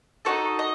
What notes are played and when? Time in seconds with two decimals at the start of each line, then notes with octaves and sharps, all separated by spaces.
0.25 D#4 F#4 A4 C#5
0.59 D#5